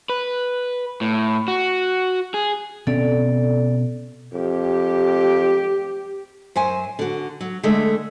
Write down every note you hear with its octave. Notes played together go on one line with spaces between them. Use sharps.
B4
A2
F#4
G#4
B2 C4 C#4 A4 D5
F2 G4
F#2 C5 G#5
D3 F#4
F#3
D3 G#3 A3